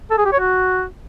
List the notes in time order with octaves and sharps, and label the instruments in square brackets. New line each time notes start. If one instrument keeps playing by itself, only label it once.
[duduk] A4
G#4
G4
C#5
F#4